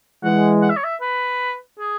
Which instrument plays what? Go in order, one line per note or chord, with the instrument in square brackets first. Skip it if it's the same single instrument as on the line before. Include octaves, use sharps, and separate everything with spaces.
[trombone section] E3 G#3 [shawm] F#5
[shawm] F#5
E5
C#5
E5
B4
G#4